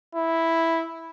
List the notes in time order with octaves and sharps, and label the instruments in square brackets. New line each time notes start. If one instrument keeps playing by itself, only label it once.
[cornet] E4